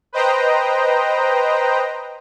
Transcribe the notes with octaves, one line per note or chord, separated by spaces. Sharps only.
B4 C5 D#5 G5 A#5